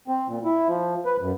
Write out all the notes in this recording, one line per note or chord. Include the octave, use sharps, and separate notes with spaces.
C4
A#2
E4
F3
B4
F#2